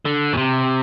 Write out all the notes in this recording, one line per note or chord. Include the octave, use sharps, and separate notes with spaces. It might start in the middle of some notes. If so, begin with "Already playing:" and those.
D3
B2
C3